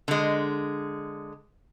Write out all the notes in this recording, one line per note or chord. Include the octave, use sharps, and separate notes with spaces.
D3 G#3